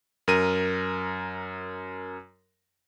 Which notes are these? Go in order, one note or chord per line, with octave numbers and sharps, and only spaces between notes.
F#2 A#4 D#7